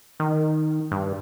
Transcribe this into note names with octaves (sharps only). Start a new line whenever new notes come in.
D#3
G2